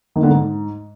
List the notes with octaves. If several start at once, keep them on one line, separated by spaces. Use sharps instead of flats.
D#3
D3
G#2